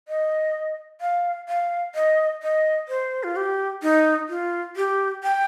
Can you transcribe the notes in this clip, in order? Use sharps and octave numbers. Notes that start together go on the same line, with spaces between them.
D#5
F5
F5
D#5
D#5
C5
F4
G4
D#4
F4
G4
G5